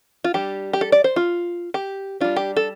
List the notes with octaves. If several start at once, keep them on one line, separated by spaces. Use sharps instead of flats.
F4
G3 D4 G4
G4
A4
D5
C5
F4
G4
G3 D4 F4
G4
A4